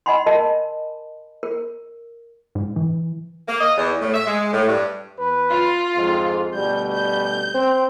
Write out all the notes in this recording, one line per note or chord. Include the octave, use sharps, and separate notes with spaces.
D#5 F#5 G#5 B5 C6
A#4 D#5 A5
A#4
G#2
E3
A#3
D#5
E2
A2
E5
G#3
A2
G2
E2 B4
F4
F2 G#2
D2 B2 G3 G6
G6
C4